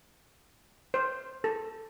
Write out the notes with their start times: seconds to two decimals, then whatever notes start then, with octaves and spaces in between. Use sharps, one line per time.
0.94 C5
1.44 A4